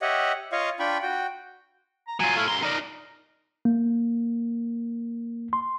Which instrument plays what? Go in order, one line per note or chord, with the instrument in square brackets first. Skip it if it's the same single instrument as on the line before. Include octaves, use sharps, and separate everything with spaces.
[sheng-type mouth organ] G4 C#5 D#5 E5 F#5
F4 C#5 D#5 F5 C#6
D4 F4 G5 B5 C#6
F#4 G5
[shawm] A#5
[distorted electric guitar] F#3 F4 [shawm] G#5
[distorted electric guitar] A3 E4 [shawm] F5
[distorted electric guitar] F#2 C6 [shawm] A#5
[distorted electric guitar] D#4 D5 [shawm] A#4
[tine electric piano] A#3
C6